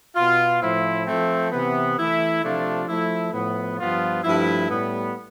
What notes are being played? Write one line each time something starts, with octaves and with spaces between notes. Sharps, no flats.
B2 B3 F4
A2 F3 C4 E4
F3 A3 C4
C3 E3 B3
E3 A3 E4
C3 F3 A3 D4 F4
F3 A3 E4
A2 F3 B3
G2 F3 B3 F4
G2 F3 A3 E4
A2 G3 B3